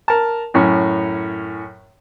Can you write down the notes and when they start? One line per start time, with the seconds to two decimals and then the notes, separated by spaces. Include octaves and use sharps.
0.08 A#4 A5
0.54 F#2 A2 C#4